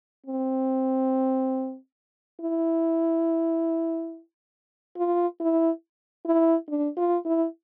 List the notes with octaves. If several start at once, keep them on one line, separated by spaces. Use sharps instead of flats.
C4
E4
F4
E4
E4
D4
F4
E4